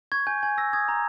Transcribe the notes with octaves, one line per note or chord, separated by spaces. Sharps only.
C#6 G#6
G#5 G6
G#5 G#6
E6 A#6
D#6 G#6
A#5